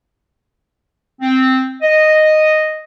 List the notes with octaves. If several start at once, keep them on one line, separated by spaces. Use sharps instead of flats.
C4
D#5